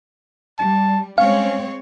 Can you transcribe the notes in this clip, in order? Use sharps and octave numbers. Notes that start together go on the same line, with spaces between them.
G3 A5
G#3 C4 C#4 C#5 F5